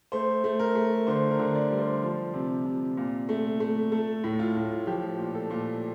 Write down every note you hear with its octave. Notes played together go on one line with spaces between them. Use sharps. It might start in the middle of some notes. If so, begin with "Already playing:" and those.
A3 C5
A3
A#4
A3
D3 C5
A#4
D3
D5
G3 D5
C5
F3
C3
C3
A#2
A3
A3
A3 A4
A2
F4
A2
F3 G4
A#2
A4
A#2